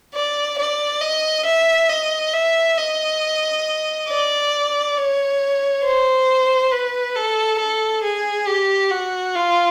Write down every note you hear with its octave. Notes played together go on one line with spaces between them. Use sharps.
D5
D5
D#5
E5
D#5
E5
D#5
D5
C#5
C5
B4
A4
A4
G#4
G4
F#4
F4